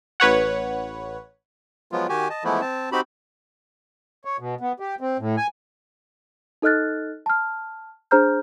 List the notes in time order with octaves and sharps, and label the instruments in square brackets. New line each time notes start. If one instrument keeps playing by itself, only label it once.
[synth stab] A1 B4 C#5 F#5
[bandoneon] F3 F#3 G#3 B3 F4
D#3 F#4 G4 G#5
D#5 A5
E3 F3 G#3 A3 B3 E4
C4 A5
C4 D#4 F#4 G4 B5
[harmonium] C#5
B2
B3
G4
C4
A2
G#5
[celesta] D#4 A4 D#5 F6 F#6 A6
A5 F6
D4 G#4 C5 A#5 F6 G6